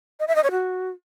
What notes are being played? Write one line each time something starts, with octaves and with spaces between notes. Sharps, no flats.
D#5
E5
D#5
C#5
F#4